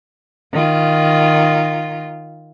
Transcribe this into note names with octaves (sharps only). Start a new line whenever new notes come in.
D#3 F4